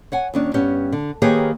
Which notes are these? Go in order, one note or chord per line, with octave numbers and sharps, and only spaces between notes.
C#5 F#5 G#5
D#2 C#4 D4
G2 B3 C#4 G4
D3
D#3 A#3 G4 G#4 B4 C#5